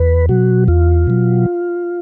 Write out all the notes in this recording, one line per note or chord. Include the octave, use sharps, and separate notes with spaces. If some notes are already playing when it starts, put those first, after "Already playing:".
Already playing: E2 B4
B2 F#3 F#4
E2 F4
B2 F#3